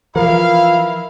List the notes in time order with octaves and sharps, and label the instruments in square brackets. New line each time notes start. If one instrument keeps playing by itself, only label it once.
[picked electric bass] E3 F3 [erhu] E4 [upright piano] A#4 [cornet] F5